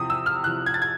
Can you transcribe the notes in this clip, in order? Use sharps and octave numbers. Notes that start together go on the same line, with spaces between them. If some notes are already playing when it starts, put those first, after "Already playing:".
Already playing: E2 C3 F3 D#6
E6
F6
E2 C3 F3 F#6
G#6
A6
G#6